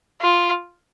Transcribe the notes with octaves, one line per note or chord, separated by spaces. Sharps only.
F4